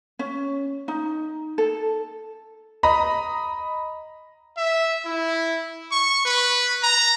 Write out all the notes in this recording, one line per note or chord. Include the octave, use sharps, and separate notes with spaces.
C#4
D#4
A4
D#5 A#5 B5
E5
E4
C#6
B4
A#5